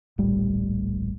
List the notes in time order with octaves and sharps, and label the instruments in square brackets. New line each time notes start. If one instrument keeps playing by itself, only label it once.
[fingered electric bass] D1 A#1 A2 G3